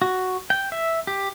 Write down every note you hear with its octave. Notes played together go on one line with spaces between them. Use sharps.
F#4
G5
E5
G4